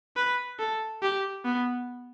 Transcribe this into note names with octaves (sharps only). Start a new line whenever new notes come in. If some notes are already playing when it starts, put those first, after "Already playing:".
B4
A4
G4
B3